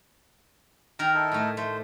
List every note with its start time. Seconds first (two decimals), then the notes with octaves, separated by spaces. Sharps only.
0.99 D#3 A#4 A#5
1.14 D#4 E4 A4
1.32 A2 A3
1.57 A3 C5